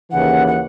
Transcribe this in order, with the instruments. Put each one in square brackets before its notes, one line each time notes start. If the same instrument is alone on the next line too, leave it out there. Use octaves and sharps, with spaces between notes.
[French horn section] D#2 C#3 E3 [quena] F#5
[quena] F#5